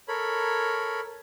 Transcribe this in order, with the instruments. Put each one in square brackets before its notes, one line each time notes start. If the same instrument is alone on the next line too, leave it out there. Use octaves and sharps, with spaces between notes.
[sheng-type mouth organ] A4 A#4 C#5 B5